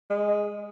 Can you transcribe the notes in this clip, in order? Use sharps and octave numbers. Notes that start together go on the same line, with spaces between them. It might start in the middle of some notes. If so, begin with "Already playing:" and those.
G#3